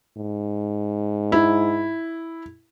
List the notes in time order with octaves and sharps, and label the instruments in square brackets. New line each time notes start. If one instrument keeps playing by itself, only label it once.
[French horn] G#2
[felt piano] E4